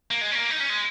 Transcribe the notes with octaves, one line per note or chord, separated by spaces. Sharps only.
A#3
G#3
C#4
A#3
D#4
C#4
G#3